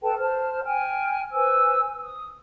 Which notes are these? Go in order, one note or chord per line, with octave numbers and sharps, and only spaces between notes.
A4 B4 G5 A5
C5 A5 F6
G5 G#5 F6
B4 C5 G#5 E6
D#6